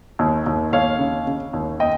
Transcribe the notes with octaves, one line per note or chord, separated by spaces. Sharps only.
D#2
D#2
D#2 C#5 F5
C#3
C#3
D#2
D#5 G5